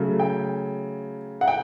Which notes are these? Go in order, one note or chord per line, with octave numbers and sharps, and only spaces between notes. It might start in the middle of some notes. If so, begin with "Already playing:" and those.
Already playing: C#3 F#3 A3
G5
F#5
G5